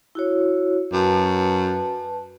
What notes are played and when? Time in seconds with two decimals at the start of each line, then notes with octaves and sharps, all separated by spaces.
0.15 E4 F#4 C#5
0.93 F#2 B4 A5